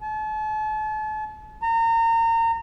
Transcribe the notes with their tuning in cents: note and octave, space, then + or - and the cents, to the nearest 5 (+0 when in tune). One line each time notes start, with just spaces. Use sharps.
A5 -40
A#5 -30